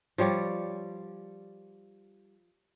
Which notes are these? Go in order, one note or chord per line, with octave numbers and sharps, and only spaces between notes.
F3 G3 C#5 D5